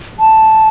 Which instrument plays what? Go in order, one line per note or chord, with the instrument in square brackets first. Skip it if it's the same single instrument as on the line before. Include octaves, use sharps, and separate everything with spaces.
[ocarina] A5